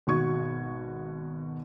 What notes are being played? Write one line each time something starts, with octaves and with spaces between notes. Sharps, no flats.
G#1 B2 F#4 C#6 G#6